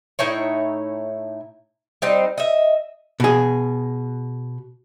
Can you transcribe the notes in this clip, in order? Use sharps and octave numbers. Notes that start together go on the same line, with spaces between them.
A2 D#4 E4 C#5
G3 C4 D#4 C5
D#5 E5
B2 G#4